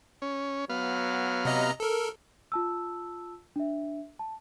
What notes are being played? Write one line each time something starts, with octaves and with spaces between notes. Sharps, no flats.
C#4
F#3 B3 F5
C3 D#5 A#5
A4 A#4
F4 A5 E6
D4 E5
A5